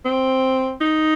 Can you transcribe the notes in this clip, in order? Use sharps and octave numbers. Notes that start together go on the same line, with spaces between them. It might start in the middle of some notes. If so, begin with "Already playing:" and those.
C4
D#4